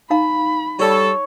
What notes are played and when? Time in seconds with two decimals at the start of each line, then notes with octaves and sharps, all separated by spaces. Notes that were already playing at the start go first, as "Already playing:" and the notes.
0.10 D#4 F5 A#5 B5
0.80 G3 A4 C#5